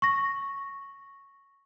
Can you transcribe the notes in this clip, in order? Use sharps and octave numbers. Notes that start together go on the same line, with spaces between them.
C#6 A#6